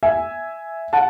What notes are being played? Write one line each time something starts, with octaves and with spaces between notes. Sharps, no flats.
E5 G#5
F#5 A5